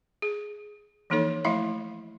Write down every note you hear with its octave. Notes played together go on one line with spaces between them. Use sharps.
G#4
E3 F3 A#3 D#4 A4 C#5
F3 A3 E4 E5 F5 B5